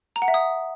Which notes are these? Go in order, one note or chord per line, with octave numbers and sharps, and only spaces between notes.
A#5
F#5
E5
D#6